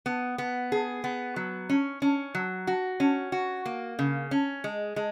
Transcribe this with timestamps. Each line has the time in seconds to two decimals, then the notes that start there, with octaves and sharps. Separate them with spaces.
0.06 B3
0.38 B3
0.72 G#4
1.04 B3
1.36 F#3
1.69 C#4
2.02 C#4
2.35 F#3
2.67 F#4
3.00 C#4
3.32 F#4
3.66 A#3
3.99 C#3
4.31 C#4
4.64 G#3
4.96 G#3